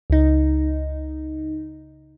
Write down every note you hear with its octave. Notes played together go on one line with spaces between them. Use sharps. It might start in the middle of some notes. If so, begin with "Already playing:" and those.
C#2 D#4